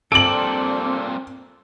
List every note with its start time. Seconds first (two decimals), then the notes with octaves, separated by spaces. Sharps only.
0.12 G2 A#2 C4 A4 D5 D7 F#7